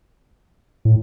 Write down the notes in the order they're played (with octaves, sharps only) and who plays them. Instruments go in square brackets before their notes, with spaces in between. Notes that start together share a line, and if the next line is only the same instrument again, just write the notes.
[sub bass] A2